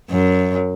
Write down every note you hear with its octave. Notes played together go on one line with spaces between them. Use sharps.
F#2